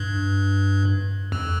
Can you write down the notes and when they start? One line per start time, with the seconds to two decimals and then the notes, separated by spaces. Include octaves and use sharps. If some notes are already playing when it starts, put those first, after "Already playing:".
Already playing: G2
1.32 F2